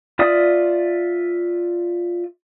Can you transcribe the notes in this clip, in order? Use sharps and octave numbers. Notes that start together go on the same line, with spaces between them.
F4 D5 E5 D#6